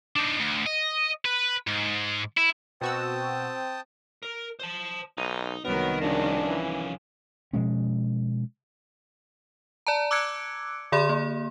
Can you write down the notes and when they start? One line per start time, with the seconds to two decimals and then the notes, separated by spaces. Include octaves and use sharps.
0.16 D4 D#4
0.39 D2
0.66 D#5
1.25 B4
1.67 G#2
2.37 E4
2.81 B2 C4 F#4 G5 A5 D#6 E6
4.23 A#4
4.60 C5 A5
5.18 B1 D#4
5.65 C2 D#3 F#3 B3 A#4
6.02 F#1 F3 C#4 D4
6.46 E3
7.53 B2 F3 G#3 C#4
9.87 D5 A5 A#5
10.11 D6 E6 F#6 G#6 C#7 D7
10.92 D3 G#4 D5 B5 C6
11.09 A#3